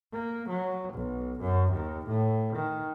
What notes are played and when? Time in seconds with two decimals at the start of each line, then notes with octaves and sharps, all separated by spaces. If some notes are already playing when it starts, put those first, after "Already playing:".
0.13 A#3
0.49 F#3
0.93 B1
1.41 F#2
1.72 D#2
2.07 A2
2.56 D#3